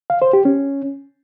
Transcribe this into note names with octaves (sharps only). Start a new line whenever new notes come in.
F5
C5
G4
C#4